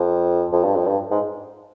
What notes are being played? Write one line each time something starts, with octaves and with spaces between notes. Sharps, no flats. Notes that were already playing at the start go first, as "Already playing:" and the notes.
Already playing: F2
F2
G2
F2
G2
G#2